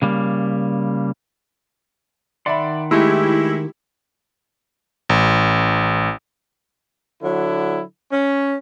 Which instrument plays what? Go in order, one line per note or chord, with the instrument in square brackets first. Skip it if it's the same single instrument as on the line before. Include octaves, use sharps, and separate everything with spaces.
[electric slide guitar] C#3 G3 A#3
[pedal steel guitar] D#3 F#5 C6 [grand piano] D5 E5 B5
[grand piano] G#3 A3 [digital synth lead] E4 [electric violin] G4
[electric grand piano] A1
[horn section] D3 F#3 E4
C#4